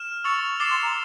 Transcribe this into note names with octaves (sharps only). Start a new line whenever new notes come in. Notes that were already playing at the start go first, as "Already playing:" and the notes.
Already playing: F6 E7
C#6 E6 A6 C#7 F7
D6 A6 C7 E7 G7
C6
A#5